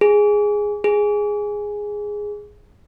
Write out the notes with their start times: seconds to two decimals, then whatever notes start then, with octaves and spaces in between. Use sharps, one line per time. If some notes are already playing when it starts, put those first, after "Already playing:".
0.01 G#4
0.84 G#4